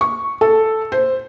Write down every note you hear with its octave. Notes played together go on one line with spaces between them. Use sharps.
C#6
A4
C5